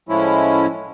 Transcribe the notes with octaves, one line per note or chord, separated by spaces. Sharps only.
A2 F3 G#3 C#4 E4